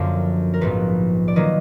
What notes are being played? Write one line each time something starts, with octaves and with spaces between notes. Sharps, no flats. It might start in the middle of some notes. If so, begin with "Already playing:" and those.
Already playing: F#2 D3 F3 A#3 D4
A#4
A#1 G#2 F3 B3 B4
D5
D#3 F#3 A#3 B4 D#5